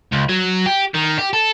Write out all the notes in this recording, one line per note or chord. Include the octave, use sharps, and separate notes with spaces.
C#2
F#3
G4
D#3
G4
A4